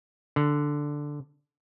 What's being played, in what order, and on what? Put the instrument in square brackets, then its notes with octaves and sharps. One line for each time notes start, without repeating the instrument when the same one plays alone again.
[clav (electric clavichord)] D3